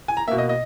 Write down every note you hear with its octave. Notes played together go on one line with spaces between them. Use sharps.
G#5
A#5
B2 A#3 E5
D#5
D#5